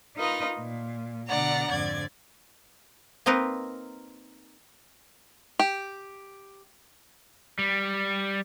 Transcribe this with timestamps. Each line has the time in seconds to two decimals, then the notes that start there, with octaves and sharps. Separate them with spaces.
0.16 D#4 F4 A#4 B4 D#5
0.58 A#2
1.29 B2 D3 D4 D5 F#5 A#5
1.71 F2 G#2 D3 D5 G#6
3.26 A#3 C4 D#4 A#4 B4
5.59 G4
7.59 G3